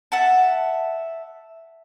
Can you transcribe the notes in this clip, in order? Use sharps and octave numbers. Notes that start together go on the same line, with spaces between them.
E5 F#5 A5